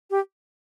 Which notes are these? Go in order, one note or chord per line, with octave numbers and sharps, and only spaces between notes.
G4